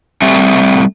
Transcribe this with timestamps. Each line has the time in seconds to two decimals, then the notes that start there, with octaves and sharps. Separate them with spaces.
0.22 G3 A3 C4 E5